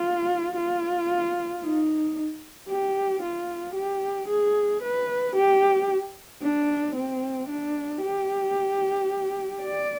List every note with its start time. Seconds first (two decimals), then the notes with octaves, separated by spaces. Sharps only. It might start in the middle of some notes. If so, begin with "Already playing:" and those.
Already playing: F4
0.56 F4
1.63 D#4
2.69 G4
3.22 F4
3.75 G4
4.28 G#4
4.82 B4
5.35 G4
6.42 D4
6.95 C4
7.48 D4
8.02 G4
9.62 D5